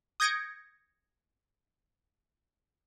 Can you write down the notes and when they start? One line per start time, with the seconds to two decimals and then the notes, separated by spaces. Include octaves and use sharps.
0.20 D#6 G6 G#6 A#6 C#7 D7